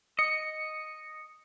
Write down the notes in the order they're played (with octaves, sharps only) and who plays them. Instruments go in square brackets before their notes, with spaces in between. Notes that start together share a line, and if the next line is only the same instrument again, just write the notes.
[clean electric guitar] D#5 [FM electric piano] C#7